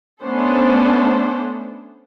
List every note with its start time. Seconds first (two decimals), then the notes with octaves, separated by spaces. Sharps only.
0.22 A3 B3 C#4 D4 A4 C5